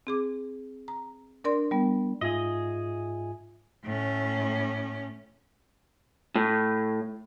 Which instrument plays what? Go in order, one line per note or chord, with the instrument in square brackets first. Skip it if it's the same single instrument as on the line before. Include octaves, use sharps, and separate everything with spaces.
[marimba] C4 G#4 D6
A#5
D4 A#4 D5 C6
G3 B3
[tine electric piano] G#2 F4 E5 [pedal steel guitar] G#4 D#5
[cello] A2 C#4
[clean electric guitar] A2